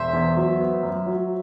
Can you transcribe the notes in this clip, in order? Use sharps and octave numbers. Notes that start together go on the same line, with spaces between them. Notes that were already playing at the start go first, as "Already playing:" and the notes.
Already playing: E1 C5 E5
E2
F#3
B3
F#2
F#3